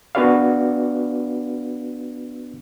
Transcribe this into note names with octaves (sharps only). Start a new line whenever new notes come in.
B3 D4 F#4 B4 D5 F5